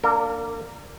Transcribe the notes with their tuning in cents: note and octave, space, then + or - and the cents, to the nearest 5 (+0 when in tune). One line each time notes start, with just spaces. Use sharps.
A#3 +0 D4 +0 A#4 -40